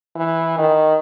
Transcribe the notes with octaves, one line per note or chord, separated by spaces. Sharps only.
E3
D#3